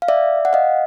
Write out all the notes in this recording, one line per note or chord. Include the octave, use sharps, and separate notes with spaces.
F5
D5 E5
F#5
D#5 F5